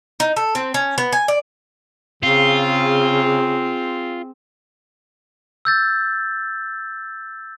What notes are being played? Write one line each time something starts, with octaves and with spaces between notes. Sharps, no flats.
D#4
A4
C4
C#4
B3
G#5
D5
C#3 C4 F4 G#4
E6 G6 A6